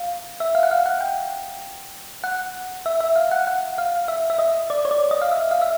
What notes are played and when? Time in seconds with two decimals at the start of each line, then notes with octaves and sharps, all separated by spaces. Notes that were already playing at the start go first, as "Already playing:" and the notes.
Already playing: F5
0.40 E5
0.55 F5
0.63 F#5
0.71 F5
0.86 F#5
1.01 G5
2.24 F#5
2.86 E5
3.00 E5
3.16 F5
3.31 F#5
3.47 F#5
3.78 F5
4.08 E5
4.30 E5
4.39 D#5
4.70 D5
4.85 C#5
4.91 D5
5.11 D#5
5.21 F5
5.32 E5
5.51 F5
5.61 E5